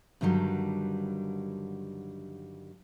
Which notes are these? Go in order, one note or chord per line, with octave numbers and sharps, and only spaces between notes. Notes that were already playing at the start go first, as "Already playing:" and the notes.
G2 D3 D#3 F#3 G3